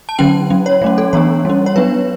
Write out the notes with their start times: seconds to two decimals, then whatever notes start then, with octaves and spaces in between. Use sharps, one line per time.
0.09 A5
0.19 D3 F#3 C#4 G5
0.50 F#3 C#4
0.66 C#5
0.82 F#3 A3 C#4
0.98 A4
1.13 E3 B3 D4 C#5
1.45 G3 C#4
1.66 C#5
1.76 F#3 B3 D4 B4